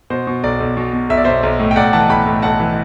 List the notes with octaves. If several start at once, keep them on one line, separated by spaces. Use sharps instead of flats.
B2 C5
B2
B1 D5
B1
B2
B2
B1 E5
D5
B1 C5 E5
B1
A2
G5
B1 D5 F#5
E3 F#5 A5
B1 G5 B5
A2
B1 F#5 A5
E3